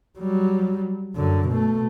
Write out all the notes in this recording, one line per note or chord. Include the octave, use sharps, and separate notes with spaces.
F#3 G3
F#2 D3
B2 A3